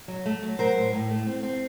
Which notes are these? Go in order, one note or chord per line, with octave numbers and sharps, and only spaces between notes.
F#3
A3
F#3
F#3 A#4 C5
A2
A2
A3
C4
C4